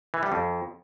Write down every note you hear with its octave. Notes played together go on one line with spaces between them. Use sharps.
E3
G3
F2